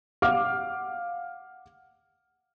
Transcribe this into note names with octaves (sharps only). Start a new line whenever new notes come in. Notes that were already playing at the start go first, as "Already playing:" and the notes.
F5 F#5 D6 F6